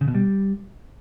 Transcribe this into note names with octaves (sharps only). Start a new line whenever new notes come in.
C#3
B2
G3